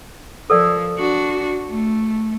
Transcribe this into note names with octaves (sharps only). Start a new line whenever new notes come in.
F3 A4 A#4 D5
D4 F#4
A3